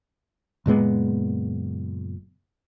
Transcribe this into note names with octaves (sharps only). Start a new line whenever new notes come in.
F#1 A#2 G#3 B3